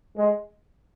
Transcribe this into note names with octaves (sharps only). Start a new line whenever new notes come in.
G#3